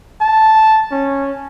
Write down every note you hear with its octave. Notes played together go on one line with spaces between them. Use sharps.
A5
C#4